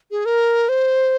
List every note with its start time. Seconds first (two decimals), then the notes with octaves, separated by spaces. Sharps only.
0.11 G#4
0.26 A#4
0.69 C5